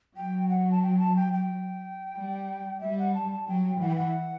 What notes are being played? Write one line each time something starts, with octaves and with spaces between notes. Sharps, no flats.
F#3 G5
F#5
A5
G5
A5
G5
G5
G3
G3 E5
F#5
A5
A5
F#3 G5
E3 F#5
G5
F#5